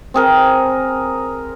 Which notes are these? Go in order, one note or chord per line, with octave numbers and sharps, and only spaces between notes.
C4 G#4 A#4